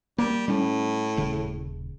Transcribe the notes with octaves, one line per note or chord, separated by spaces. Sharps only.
G3 A#3
A2 G3 C#4
D#1 C#3